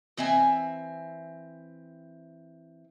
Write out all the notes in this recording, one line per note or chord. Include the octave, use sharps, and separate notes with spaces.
E3 C4 E5 G#5